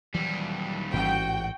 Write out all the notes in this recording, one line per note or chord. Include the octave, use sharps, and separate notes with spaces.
D#2 E3 F#3 G3
A1 G#2 C#4 F#4 G5